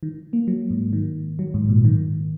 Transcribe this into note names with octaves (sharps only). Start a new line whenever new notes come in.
D#3
A#3
F#3
G#2
D#3
F#3
G#2
A#2
D#3